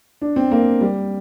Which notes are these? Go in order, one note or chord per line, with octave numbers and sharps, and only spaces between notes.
D4
C4
A#3
G3